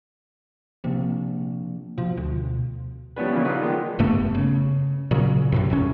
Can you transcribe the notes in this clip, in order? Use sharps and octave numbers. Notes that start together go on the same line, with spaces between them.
C3 F3 A#3 D4
B2 F3
D2
F3 G3 B3 C#4 D4 B4
A#2 C#3 E3 F3
D#4 F4 B4 D5 F#5
D#3 F3 G#3
F1 G2 A3 B3
C#3
A#2 C#3 F#3
F#2 A2 C3
G1 E2 C#4